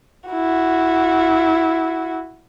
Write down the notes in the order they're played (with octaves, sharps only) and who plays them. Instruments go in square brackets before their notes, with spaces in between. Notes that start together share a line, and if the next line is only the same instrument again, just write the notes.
[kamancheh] E4 F#4